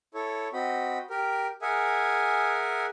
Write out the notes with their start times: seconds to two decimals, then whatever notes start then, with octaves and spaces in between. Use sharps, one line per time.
0.14 E4 A4 C#5
0.53 C4 F#4 D#5 B5
1.10 G4 A#4
1.62 G#4 A#4 E5 F#5 G#5